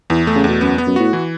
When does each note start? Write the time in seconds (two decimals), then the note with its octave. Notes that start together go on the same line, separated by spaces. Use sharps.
0.10 E2 E3
0.27 A3
0.35 C#3
0.44 E2 B2
0.61 F#2 B3
0.78 B3
0.87 F#2
0.96 A2 F#4
1.13 E3